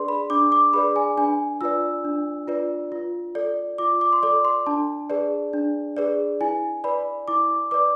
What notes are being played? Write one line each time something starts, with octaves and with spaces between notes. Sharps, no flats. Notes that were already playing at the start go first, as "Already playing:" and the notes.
Already playing: D4 G#4 B4 D5 C6
B5
D4 D6
D6
G#4 B4 D5 B5
G#5
D4 G#5
F4 B4 D5 E6
D4
F4 B4 D5
F4
A4 D5
F4 D6
D6
C6
A4 D5 D6
C6
D4 A5
G#4 B4 D5
D4
G#4 B4 D5
E4 G#5
B4 D5 B5
E4 D6
B4 D5 D6